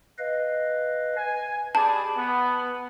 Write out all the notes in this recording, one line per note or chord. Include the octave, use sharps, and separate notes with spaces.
B4 D#5 F5
G#5
G4 G#4 D5 A5 B5
B3